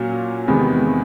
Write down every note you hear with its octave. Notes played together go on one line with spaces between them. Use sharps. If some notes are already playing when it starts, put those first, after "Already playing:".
Already playing: A#2 F#3 A#3 C#4 F#4
E2 C3 D#3 G#3 B3